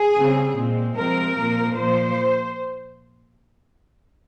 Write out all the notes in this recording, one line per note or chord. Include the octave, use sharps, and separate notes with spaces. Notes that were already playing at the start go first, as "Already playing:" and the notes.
Already playing: G#4
C#3 G3 C4
A#2 G#3 C4
C3 F3 G#3 C4 A#4
A#2 F3 A#3
A#2 F3 A#3 C5